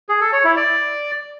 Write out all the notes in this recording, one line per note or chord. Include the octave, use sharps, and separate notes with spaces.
G#4
A4
C#5
E4
D5